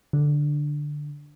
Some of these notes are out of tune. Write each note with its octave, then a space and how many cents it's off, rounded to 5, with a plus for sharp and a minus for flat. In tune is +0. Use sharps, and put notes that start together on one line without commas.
D3 +5